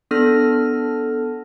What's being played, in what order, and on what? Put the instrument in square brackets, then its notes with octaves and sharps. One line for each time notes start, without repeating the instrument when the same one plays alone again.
[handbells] B3 D4 A4 F6 A#6